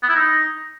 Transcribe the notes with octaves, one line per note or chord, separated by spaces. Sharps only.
B3
E4
D#4